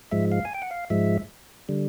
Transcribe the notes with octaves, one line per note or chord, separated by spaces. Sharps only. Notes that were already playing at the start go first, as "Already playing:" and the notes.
G#2 F3 G#3 E5
F5
G#5
G5
F#5
F5
G#2 F3 G#3 E5
D3 G3